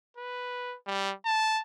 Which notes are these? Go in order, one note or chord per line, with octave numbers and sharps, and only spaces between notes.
B4
G3
A5